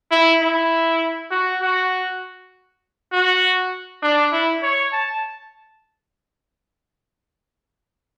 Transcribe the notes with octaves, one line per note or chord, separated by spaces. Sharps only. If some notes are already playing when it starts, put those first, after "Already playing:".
E4
E4
F#4
F#4
F#4
D4
E4
C#5
A5